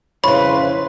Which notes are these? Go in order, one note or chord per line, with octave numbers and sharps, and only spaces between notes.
F2 C#3 E4 B4 C#5 B5 C6